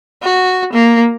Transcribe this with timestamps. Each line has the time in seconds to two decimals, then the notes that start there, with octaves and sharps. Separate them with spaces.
0.23 F#4
0.73 A#3